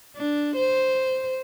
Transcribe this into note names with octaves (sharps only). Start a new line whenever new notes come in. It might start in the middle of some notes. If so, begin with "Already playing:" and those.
D4
C5